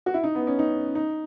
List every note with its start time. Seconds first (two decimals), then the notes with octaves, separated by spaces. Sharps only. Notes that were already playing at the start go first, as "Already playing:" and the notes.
0.06 F#4
0.14 E4
0.24 D#4
0.35 B3
0.47 C#4
0.59 D#4
0.95 D#4